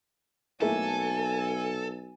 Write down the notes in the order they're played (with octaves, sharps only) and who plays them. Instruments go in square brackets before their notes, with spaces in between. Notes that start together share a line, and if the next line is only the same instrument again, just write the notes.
[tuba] B1 [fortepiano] A3 A#3 [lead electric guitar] A4 [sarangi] G#5